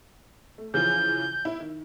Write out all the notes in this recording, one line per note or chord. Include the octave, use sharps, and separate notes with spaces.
A3
C#3 E3 F3 G6
E4
D#3